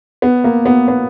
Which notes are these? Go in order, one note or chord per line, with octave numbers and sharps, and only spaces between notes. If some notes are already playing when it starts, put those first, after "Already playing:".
B3
A#3
B3
B3